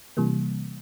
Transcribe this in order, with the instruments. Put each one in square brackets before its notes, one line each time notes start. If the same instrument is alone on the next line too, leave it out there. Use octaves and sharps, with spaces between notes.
[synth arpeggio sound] C3 E3 G3 A#3